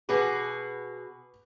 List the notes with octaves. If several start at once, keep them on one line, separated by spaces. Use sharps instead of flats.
B2 F#4 G#4 B4 D6